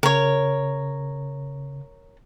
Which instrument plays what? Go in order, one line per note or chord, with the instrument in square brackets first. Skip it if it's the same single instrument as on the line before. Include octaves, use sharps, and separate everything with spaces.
[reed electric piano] C#3 [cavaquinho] A#4 C#5